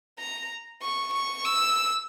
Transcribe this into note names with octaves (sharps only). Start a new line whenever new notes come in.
A#5
C#6
C#6
E6